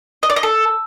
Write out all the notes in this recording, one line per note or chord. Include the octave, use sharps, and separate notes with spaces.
D#5
D5
D#5
A4